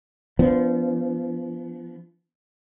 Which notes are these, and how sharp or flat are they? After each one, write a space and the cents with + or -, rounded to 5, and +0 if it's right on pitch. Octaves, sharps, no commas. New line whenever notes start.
F3 -30 B3 +0 D4 -35